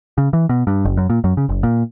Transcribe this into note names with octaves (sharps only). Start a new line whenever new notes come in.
C#3
E3
B2
G2
F#1
F#2
A#2
F#2
C#3
F#1
A#2